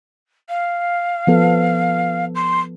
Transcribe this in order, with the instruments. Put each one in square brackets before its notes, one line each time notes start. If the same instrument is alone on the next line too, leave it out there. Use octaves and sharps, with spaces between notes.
[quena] F5
[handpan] F3 B3 A4
[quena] C6